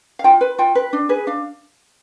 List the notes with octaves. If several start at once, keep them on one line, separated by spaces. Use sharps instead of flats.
F5
F4 G5
B4
F4 G5
B4
D4
G#4 B4
D4 F5